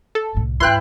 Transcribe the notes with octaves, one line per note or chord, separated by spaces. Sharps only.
A4
C2 A2
D#2 G#2 E4 B4 G5 C6 F#6